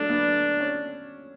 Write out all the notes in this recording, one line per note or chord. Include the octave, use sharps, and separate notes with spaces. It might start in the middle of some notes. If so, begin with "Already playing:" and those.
Already playing: F#3 A3 D4
B3
C#4